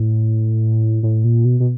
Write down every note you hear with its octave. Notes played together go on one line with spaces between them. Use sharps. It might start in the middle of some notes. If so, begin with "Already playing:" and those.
Already playing: A2
A2
A#2
B2
B2